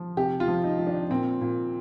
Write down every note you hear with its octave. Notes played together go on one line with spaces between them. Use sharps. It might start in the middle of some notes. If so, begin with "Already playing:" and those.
Already playing: F3
C3 G4
F4
F3
D#4
F3
D4
A#2 C4
A#2